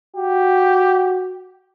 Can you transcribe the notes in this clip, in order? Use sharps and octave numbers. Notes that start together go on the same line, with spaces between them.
F#4 G4